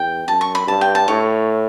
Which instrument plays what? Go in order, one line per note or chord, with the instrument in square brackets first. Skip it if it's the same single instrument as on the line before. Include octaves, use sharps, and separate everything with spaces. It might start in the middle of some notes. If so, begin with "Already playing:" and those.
Already playing: [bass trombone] E2 [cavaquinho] G5
[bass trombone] F#2 [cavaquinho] A5
[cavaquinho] C#6
B5
[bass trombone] G2 [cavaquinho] A5
[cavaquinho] G5
A5
[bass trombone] A2 [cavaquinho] C#5